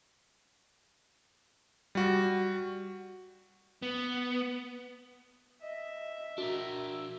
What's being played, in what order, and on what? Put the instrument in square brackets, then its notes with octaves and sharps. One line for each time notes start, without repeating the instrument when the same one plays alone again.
[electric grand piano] G3 F#4
[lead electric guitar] B3
[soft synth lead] D#5 [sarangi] E5
[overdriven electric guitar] D4 A#4 [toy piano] F#4 [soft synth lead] E6